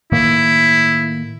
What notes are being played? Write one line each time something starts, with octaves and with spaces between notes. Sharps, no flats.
A2 D#3 A#3 E4